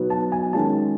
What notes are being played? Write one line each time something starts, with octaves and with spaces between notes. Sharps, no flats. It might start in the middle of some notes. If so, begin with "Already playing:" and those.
Already playing: B2 F#3 B3 D#4
A5
G#5
D#3 G#3 C#4 F4 A5